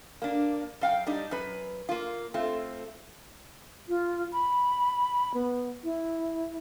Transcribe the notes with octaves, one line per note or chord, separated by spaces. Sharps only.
A#3 D4
F#2 F5 G5
G3 D4 D#4
F#2 B4
A#3 F4
A3 C4 F4
F4
B5
B3
E4